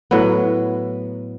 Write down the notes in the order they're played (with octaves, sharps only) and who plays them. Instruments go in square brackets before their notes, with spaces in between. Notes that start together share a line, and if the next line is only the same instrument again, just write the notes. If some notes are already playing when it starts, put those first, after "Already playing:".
[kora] A2 F#3 B3